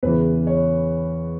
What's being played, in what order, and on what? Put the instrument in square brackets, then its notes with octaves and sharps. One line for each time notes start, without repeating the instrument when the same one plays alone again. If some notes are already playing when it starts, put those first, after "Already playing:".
[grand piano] E2 C#3 E3 B4
C#5